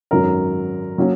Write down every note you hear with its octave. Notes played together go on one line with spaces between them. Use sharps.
G#1 F#2 F#3 A#4
F#3 A#3 C#4